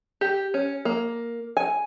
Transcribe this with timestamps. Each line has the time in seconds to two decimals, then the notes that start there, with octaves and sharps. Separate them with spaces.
0.21 G4
0.54 C#4
0.85 A#3
1.57 G#5